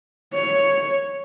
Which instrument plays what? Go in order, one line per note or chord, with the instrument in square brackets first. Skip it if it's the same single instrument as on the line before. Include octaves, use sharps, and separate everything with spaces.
[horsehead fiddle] C#5